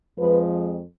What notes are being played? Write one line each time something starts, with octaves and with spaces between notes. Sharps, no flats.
F2 F3 G#3 B4